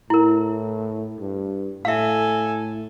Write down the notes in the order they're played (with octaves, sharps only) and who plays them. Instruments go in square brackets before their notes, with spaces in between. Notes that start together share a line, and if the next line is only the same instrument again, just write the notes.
[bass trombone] A2 [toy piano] E4 A#4
[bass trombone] G2
[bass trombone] A2 [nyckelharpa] A4 G#5 [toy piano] E5 F5